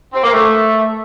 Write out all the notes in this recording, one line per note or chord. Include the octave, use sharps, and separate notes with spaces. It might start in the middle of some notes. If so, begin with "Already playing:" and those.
C4
A#3
A3